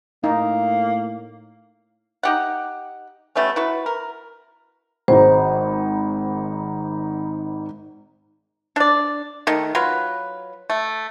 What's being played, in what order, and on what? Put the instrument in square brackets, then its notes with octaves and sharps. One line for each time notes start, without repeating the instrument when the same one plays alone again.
[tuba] A2 [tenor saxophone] A#3 [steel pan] D#4
[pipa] D#4 G4 F#5
G3 A3 B3 C#4
E4 F#4 B4
A#4
[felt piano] G#1 G#2 D#4 [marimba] C5
[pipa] D4 D5
D#3 A3
F#3 F4 B4
A3